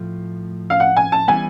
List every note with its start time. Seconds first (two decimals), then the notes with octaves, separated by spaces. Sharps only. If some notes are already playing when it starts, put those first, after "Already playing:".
Already playing: A2 F3 A3
0.70 F5
0.80 F#5
0.97 G#5
1.12 A5
1.28 E3 G3 B3 G#5